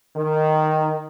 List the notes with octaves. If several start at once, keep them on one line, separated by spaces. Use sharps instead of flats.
D#3